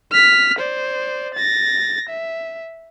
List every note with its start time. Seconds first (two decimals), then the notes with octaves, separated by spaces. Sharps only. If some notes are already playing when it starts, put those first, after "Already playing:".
0.12 F6 B6
0.59 C5 D5
1.34 A6 A#6
2.10 E5